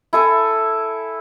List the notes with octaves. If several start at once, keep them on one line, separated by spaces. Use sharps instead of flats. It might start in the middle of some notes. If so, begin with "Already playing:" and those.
E4 A4 G#5